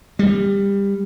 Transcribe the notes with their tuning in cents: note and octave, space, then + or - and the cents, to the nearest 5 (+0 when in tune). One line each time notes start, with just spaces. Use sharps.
G3 +20